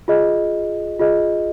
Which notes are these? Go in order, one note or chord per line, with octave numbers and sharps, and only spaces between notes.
F4 G#4 D#5
F4 G#4 D#5